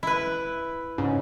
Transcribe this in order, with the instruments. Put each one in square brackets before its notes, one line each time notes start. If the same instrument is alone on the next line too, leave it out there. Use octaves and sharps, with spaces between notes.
[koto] E4 B4
[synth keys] G#2 C#3